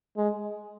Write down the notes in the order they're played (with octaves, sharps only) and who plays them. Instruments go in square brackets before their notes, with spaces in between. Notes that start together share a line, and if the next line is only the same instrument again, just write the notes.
[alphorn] G#3